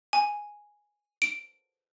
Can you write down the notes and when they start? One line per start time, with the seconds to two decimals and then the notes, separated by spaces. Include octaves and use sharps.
0.13 G#5
1.22 D7